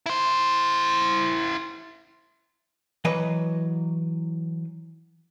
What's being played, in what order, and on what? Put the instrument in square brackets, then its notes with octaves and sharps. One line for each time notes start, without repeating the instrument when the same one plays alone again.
[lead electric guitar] E4 C5
[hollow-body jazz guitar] E3 F#3 B4 D#5